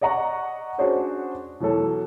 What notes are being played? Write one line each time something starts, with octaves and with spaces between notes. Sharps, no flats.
D5 D#5 F#5 A#5 C#6
C#4 D4 F#4 G#4 C5 C#5
B2 E3 F#3 A4